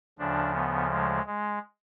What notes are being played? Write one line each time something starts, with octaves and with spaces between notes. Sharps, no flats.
D2 C#3 F3 D4
B3
G#3
G#3